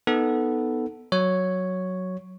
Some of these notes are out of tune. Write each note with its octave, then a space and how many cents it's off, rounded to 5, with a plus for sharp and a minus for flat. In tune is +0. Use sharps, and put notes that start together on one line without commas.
B3 +0 D#4 +0 A4 +0
F#3 +0 C#5 +0